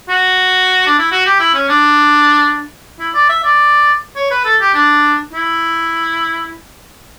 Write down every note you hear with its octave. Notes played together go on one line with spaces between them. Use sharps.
F#4
D4
E4
F#4
G4
E4
C#4
D4
E4
D5
E5
D5
C#5
B4
A4
G4
D4
E4